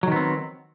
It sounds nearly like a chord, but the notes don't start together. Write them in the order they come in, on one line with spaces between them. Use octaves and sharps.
F#3 D#3 B3 C4